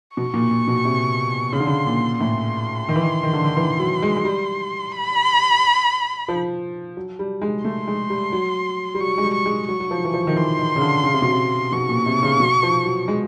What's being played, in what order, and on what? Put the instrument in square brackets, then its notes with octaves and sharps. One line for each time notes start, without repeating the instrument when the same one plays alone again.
[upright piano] B2 [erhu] C#6
[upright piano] A#2
A#2
B2
C3
[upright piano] C#3 [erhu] C6
[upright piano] D3
C#3
A#2
[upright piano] A2 [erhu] C6
[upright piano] D#3
E3
D#3
D#3
D3
D#3
E3
F#3
G#3
G#3
G3
[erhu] B5
[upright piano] F3
F#3
G3
G#3
[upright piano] A3 [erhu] C6
[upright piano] G#3
G3
F#3
G3
[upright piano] F#3 [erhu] C#6
[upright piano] G#3
G3
[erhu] C#6
[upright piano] G#3
[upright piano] F#3 [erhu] C#6
[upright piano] F#3
F3
E3
F3
D#3
[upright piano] E3 [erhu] C6
[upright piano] D#3
C#3
D3
C#3
C3
B2
C3
[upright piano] B2 [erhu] C#6
[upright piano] A#2
C3
C#3
B2
F3
F#3
G#3